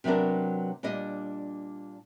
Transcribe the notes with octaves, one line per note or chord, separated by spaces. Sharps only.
C3 F#3 B3 D4 A#4
A#2 G3 D4 D#5